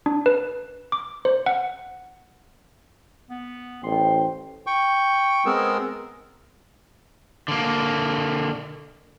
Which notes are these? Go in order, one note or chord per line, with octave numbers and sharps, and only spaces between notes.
D4
B4
D6
C5
F#5
B3
A1 C5 G5 C6
G5 C#6
G#3 B3 C4 G#4 A#4 E6
D3 A#3